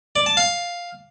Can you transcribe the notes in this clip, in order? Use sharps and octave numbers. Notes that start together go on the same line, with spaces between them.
D5
A5
F5